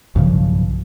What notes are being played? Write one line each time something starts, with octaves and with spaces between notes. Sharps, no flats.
B1 G2 C#3 F3